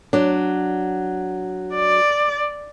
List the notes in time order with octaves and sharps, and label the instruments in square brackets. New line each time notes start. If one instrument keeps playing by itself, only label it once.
[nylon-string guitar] F#3 D4
[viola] D5